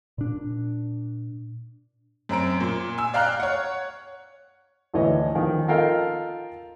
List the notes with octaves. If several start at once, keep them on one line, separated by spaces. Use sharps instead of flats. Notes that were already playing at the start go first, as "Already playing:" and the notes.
A#2 D4
F#2 C4 A#5 D7
A#2
G#5 E6
D5 F5 G5 A#5 F6 F#6
C#5 F#5
D2 A2 E3 C#5 D#5
D#3 F3
F4 A4 A#4 D#5 F5 G5